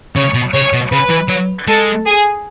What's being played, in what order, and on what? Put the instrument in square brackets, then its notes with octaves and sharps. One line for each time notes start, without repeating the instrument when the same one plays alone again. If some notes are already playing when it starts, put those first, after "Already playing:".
[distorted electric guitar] C#3 [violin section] C#5
[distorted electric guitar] B2
[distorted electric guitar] C#3 [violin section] C#5
[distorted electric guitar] B2
[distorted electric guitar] C#3 [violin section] B4
[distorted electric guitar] E3
F#3
[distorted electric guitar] G#3 [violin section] A4
[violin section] G#4